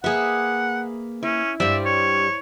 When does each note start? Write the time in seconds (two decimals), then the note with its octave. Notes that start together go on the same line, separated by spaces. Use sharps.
0.04 A#3 G#4 B4 E5 F#5
1.23 C#4 E4
1.60 G2 G3 C5 D5 E5 B5
1.85 C#5